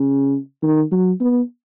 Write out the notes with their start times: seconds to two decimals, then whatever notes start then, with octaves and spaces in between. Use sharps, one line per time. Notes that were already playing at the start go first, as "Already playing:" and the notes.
Already playing: C#3
0.62 D#3
0.91 F#3
1.20 B3